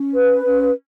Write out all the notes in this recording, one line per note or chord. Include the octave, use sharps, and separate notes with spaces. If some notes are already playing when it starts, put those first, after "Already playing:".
Already playing: C#4
B4
C#4